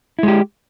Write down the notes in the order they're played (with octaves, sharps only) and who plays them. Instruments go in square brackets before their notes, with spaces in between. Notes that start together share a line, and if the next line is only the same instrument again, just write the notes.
[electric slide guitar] E4
G#3
G4